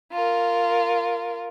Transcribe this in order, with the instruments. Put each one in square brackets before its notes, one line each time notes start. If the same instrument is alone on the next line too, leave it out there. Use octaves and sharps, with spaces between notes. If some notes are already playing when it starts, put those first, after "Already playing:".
[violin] F4 A#4